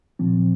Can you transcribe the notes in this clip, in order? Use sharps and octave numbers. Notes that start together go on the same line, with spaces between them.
A#2 F3 C4